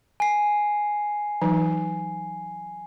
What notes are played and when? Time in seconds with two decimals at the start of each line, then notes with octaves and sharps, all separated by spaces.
0.20 G#5 C7
1.42 E3 F#3 D#4